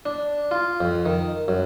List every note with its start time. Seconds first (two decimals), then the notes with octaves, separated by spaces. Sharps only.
0.06 D4
0.51 F4
0.81 F2
1.06 D#3
1.48 F#2